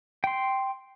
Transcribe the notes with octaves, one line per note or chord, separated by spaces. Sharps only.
G5 C6